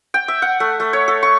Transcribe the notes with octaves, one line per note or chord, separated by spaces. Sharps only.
G5
E5
F#5
A3
A3
C#5
A4
C#6